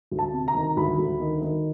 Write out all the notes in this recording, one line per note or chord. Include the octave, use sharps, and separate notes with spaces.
D2
A5
C3
A#5
D#3
D2 B5
D2
D#3
D#3